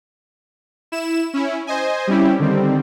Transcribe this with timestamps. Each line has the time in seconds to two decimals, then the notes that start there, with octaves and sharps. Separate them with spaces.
0.92 E4 E7
1.33 C#4 E4
1.67 C5 D#5 G#5
2.07 G3 C4 C#4 E4 G4
2.39 D3 D#3 G3 C4